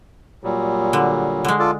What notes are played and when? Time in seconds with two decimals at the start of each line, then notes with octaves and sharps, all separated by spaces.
0.44 A#2 F#3 G3
0.93 D3
1.45 D3 G#3
1.59 F4 A4 D5